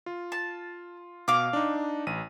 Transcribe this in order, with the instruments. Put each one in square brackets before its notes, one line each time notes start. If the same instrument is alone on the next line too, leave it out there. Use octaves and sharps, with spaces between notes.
[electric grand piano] F4
[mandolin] A5
[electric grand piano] B2 [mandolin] F5 D6
[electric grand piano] D4 D#4
A1 D#7